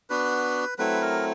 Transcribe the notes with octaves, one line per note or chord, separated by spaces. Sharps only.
B3 D4 F#4 B4
F#3 A3 C4 E4 B4
A#4